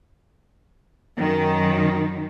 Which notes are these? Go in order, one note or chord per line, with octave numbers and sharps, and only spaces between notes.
F#2 D#3